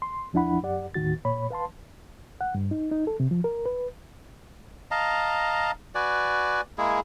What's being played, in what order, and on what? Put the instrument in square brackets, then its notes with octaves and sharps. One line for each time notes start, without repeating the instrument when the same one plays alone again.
[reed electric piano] C6
E2 F3 D4 E4 F#5 B5
F#2 G4 D5 F#5
D#2 A2 D#3 F#4 A6
A#2 C#5 B5
B4 F5 A5 C6
F#5
G2
D#4
D#4
A4
C3
F3
A#4
B4
[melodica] D#5 F5 A5 A#5
F#4 B4 D5 G#5
G#3 A#3 E4 G#4